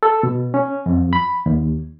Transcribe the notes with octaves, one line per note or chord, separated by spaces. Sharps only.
A4
B2
C#4
F2
B5
D#2